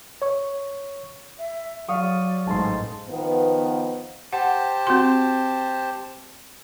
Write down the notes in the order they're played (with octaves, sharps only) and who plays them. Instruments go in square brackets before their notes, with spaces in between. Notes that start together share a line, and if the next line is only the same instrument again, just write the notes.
[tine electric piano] C#5 C#6
[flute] E5
[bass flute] F#3 [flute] D5 [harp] F5 C#6 D#6
[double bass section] A1 G#2 [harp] A5 C6
[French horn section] D#3 F3 B3
[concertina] G4 C5 A5 [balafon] F#5
[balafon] C4 F#4 C6